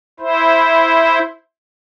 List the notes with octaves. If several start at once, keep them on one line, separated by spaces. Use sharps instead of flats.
E4 C5